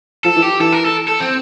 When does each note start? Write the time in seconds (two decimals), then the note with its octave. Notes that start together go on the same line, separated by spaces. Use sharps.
0.24 F3 A4
0.36 E3
0.42 G4
0.60 E3 A4
0.72 A#4
0.85 A4
1.08 A4
1.20 C4